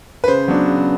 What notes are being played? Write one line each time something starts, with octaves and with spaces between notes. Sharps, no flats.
B4
C#3 C5
F#3 B3 D4
C#3